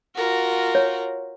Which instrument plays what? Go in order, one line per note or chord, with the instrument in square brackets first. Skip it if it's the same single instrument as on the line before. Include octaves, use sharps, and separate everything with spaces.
[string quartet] F4 F#4 A#4
[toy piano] C#5